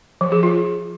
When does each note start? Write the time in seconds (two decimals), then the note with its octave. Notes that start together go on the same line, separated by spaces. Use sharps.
0.21 F3
0.32 G#4
0.43 F4